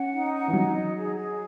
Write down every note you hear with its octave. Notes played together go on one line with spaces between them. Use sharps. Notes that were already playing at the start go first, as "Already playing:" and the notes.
Already playing: C#4 F#5
D#4
F#5
E3
F#3 D#4
D#5
G#4
G#4